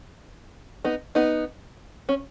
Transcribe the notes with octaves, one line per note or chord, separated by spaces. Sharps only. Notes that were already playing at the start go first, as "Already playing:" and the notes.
B3 D#4
B3 D#4
C#4